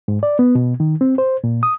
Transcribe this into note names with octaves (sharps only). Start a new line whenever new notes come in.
G#2
D5
B3
B2
D#3
C4
C5
A#2
D#6